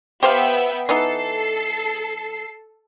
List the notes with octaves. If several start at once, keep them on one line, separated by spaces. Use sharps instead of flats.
B3 G4 C5 E5 F5 G5
E3 B3 D#4 A4 C7